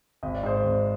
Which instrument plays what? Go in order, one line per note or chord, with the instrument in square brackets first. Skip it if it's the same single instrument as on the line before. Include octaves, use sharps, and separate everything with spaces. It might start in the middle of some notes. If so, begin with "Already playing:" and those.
[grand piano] G#1 D#5
D5
G#2 C5
D5
G#1